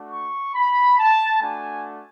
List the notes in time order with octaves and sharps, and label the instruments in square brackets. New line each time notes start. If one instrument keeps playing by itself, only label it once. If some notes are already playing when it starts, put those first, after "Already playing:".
Already playing: [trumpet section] A3 D4 F#4
C#6
B5
A5
A3 D4 F#4 G#5